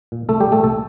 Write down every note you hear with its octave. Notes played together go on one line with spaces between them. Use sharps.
A#2
C2 A3 A4
G3 G4
A#2
A3 A4
C2 A3 A4